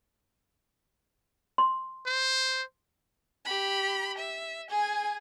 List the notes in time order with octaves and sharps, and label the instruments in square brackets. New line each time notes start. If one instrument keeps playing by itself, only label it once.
[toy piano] C6
[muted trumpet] C5
[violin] G4 B5
E5
G#4 G#5